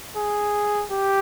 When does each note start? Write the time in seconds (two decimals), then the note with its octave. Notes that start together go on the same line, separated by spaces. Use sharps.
0.17 G#4
0.91 G4